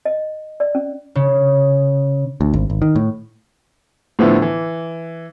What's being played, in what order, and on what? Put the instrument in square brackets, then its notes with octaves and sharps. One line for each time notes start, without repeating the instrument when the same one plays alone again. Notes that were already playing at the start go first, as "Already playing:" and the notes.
[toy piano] D#5
D5
C#4
[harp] C#3
[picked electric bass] D2
G#1
G#1
D#3
A2
[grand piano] A2 D3 F3 B3 E4
E3